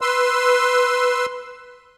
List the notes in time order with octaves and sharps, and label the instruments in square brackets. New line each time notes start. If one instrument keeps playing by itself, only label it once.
[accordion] B4 C6 E6